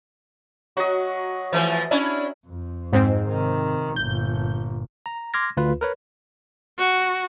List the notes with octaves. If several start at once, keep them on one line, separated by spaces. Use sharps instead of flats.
F#3 F#4 D#5
E3 F3 A3
C#4 D4 E4
F2
G#2 C4
C3 D#3
G1 A#2 G6
A#5
C6 D6 F6 G#6 A#6
D2 F4 B4
A#4 B4 C#5
F#4